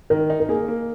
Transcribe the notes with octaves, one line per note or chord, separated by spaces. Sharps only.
D#3 A#4
D#4
A#4
A#3 G#4
A#3